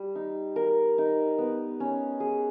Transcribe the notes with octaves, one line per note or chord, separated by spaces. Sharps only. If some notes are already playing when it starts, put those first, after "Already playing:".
Already playing: G3
D#4
A#4
D#4
B3
C#4
G#4